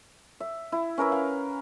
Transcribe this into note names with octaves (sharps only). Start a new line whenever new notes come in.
E5
E4
C#4 A#4 B4 E5
F5